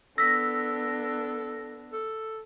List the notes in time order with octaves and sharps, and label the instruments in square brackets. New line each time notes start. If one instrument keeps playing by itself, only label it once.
[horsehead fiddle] B3 D4 [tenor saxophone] A4 [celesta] E6 B6 [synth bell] A#6
[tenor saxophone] A4